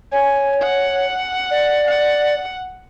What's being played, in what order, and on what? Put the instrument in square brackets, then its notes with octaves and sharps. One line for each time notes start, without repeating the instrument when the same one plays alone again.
[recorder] C#5 [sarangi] G#5
[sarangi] F#5
[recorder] D5
[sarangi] F#5